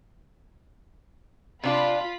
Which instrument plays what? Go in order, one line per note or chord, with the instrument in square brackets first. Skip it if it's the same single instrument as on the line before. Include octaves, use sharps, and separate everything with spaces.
[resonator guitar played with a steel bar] C3 D4 D5 [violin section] F4 B5